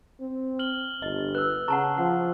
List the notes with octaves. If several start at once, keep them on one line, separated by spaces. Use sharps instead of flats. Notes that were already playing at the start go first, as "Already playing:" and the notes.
C4
F6 F#7 G7
G1 D#5
B4 E6 F#6
C#3 F#5 A5 A#5 C#6
F3 F#5